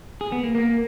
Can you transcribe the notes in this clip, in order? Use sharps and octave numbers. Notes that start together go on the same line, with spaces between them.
G#4
B3
A#3
A#3